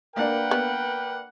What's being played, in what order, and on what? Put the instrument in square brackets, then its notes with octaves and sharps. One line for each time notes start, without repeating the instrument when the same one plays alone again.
[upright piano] A#3 D4 [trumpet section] A#4 B4 G5 [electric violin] F#5
[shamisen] B3